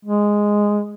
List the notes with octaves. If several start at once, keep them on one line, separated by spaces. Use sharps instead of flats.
G#3